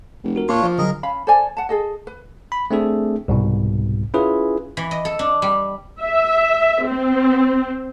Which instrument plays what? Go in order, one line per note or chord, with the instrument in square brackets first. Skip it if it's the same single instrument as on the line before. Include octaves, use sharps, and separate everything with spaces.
[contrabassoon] F1
[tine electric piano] F#4 A#4
[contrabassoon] A#2 [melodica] D4 F4 C#5 [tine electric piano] C6 C#6
[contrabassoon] F3
[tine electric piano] D3 F#3 [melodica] G#4 A#4 D#5
[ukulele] C#4 F5 B5
A4 C5 D5 G#5
F#5 A5
G#4 A4 D#5
B4
[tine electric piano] B5
A3 C4 D4 G#4 A4
C2 G#2 B2
C#4 E4 F4 G#4 B4
[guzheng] E3
D#5
A4
D4
G3
[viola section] E5
C4